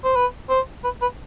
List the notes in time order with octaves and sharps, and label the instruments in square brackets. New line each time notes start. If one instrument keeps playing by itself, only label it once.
[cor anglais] C5
B4
C5
B4
B4